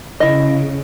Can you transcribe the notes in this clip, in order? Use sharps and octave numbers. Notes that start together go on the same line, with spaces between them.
C#3 E4 D#5